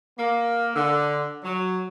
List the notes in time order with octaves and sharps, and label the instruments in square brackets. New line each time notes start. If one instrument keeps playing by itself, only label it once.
[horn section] A#3
D3
F#3